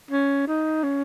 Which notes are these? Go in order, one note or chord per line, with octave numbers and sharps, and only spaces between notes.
C#4
D#4
C#4